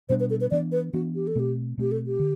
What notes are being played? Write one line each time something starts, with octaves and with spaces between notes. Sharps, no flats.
B2 G3 B3 D4 C5
B4
A4
B4
E3 B3 D4 D5
B4
E3 B3 D4 F#4
G4
A4
B2 A3 C4 G4
B2 A3 C4 G4
A4
G4
D3